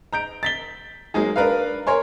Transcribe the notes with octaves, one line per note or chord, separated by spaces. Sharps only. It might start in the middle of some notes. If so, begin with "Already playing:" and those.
A#5 G6 D7
A6 B6 G7
F#3 G#3 A#3 D#4 G#4
D4 A#4 B4 F5
A#4 C#5 G#5 C6